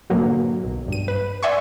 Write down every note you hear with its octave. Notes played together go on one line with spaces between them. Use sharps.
G#2 B2 D3 F#3 A#3
B1
G2 D#7
B4
D5 E5 F#5 G#5 C6 C#6